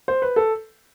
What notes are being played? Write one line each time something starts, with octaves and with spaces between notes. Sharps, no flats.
C5
B4
A4